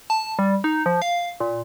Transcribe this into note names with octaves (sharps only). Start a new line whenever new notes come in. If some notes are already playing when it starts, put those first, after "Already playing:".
A5
G3
D#4
F3
F5
A#2